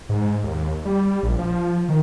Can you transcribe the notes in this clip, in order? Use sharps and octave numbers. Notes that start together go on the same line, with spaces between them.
G#2
D#2
G3
A#1
F3
D#3